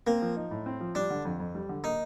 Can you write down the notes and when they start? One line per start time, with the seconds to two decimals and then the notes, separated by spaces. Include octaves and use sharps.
0.07 A#3 C4
0.22 F3
0.36 D#4
0.51 A2
0.66 C4
0.80 F3
0.95 G3 D4
1.10 D3
1.25 F2
1.40 F2
1.55 G3
1.69 D3
1.84 A#3 D#4